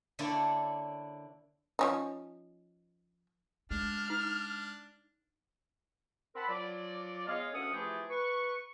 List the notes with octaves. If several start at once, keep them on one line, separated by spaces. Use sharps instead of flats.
D3 A#3 D4 E4 C#5 D5
F3 C#4 D#4
G#3 D4 F6
D4 D#4
C4 A#4 F#5 A5 B5
F3 F#3 F4 D5
G#3 B3 C#5 D#5 F5
D2 C#4 A4 F#5 D#6
E3 F3 A3 F4 G4 G#4
B4 C#6